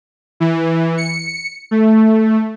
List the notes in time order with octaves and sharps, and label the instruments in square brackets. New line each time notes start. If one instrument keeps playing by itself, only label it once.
[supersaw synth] E3
C#7
A3